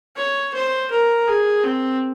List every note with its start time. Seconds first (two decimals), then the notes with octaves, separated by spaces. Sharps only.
0.16 C#5
0.54 C5
0.90 A#4
1.27 G#4
1.63 C4